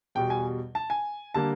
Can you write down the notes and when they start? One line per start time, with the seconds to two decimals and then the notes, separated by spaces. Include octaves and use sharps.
0.15 E2 B2 G3 G5
0.30 G#5
0.75 A5
0.90 G#5
1.34 D3 G3 A#3 A5